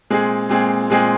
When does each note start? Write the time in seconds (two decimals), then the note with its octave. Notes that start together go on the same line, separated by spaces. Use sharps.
0.10 A#2 G#3 C4 G#4
0.49 A#2 G#3 C4 G#4
0.90 A#2 G#3 C4 G#4